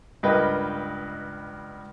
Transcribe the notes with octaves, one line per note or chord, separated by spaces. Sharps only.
C#2 G2 A#4 B4 D#5 G5